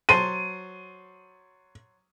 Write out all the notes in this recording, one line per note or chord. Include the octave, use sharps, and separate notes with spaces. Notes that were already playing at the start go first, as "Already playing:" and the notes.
F#3 C5 A5 D#7